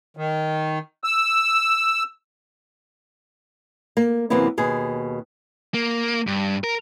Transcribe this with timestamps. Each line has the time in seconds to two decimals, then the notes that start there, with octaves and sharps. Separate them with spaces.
0.17 D#3
1.04 E6
3.97 A#3
4.30 F#2 C3 E3 A#3 B3 E4
4.58 D#2 B2 G#4
5.74 A#3
6.27 G2
6.64 A#4